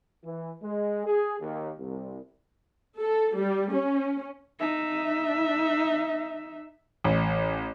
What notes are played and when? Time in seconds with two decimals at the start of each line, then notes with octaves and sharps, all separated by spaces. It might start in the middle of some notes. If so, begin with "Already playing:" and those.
0.25 E3
0.63 G#3
1.07 G#4
1.41 D#2
1.79 C2
2.99 A4
3.37 G3
3.72 C#4
4.60 D#4 E5
7.04 A1